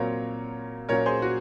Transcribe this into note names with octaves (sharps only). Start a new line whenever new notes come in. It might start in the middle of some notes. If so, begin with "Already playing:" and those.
Already playing: A#2 F#3 C4 F4 A#4 C#5
A#2 F#3 C#4 F4 A#4 C#5
G#4 C5
F#4